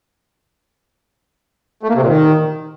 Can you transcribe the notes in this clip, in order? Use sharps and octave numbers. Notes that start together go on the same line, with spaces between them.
A3
A#3
C3
A#2
D#3